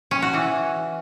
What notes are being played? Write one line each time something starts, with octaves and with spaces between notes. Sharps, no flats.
C#4
F#4
E3